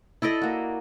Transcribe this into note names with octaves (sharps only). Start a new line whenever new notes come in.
E4 A4 D5 D#5
A#3 F#4